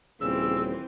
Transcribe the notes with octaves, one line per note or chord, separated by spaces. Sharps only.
D#1 C#3 E3 C4 E6